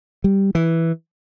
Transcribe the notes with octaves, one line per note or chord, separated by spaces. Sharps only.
G3
E3